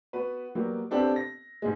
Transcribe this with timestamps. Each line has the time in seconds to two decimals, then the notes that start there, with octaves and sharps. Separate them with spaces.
0.13 B3 F#4 B4
0.55 F#3 G3 A#3 B3 G4
0.91 B3 C4 D4 G4 A4
1.16 A#6
1.62 G#2 B2 G#3